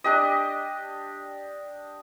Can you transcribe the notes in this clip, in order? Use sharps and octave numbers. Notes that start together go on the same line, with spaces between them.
D4 G4 D#5